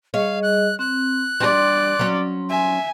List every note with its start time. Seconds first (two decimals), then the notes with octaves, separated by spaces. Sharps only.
0.14 G3 G#4 C#5 D#5 F5
0.43 F#6
0.79 C4 F#6
1.40 G3 D4 D5 C6
1.99 F#3 C#4
2.49 E5 G#5